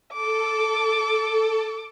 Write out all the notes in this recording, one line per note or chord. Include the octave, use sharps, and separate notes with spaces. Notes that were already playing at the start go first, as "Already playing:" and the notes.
A4 D6